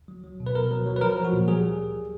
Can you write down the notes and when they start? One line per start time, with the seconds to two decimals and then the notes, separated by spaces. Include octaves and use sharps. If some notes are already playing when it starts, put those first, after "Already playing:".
0.08 F#3
0.24 F#3
0.40 B2
0.46 B4
0.55 B2 A#4
0.71 F#3
0.86 F#3
0.96 B4
1.01 F3 A#4
1.17 F3
1.24 F#4
1.33 A#2
1.48 G3 G#4
1.63 G3
1.79 G3
1.95 F#3